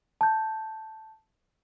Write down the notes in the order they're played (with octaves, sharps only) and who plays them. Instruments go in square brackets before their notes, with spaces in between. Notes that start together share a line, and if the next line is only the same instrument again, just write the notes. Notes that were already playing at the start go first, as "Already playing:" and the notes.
[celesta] A5 G6